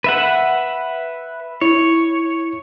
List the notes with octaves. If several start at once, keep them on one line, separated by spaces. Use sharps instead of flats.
B4 E5 F#5
E4 C#5